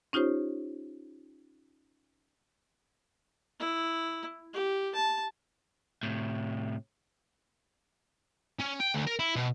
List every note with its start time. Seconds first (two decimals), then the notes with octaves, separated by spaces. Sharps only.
0.13 C#4 D#4 F4 G4 C5 C#5
3.60 E4
4.53 G4
4.95 A5
6.03 A2 C3
8.60 C#4
8.80 G5
8.95 D2
9.07 A#4
9.20 E4
9.36 B2